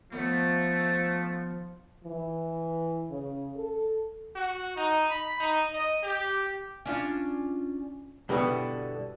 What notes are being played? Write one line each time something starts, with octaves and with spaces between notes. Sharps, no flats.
D#3 F3 A3 B3 C#4
E3
C#3
A4
F#4
D#4
B5
D#4
D#5
G4
C#4 D4 F4
G2 B2 D3 B3 E4